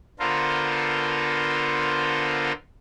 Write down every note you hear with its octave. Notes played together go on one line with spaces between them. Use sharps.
D3 B3 F4 A4 A#4 C5